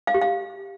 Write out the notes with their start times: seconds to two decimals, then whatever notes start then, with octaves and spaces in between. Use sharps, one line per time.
0.07 F5
0.14 G4
0.21 F5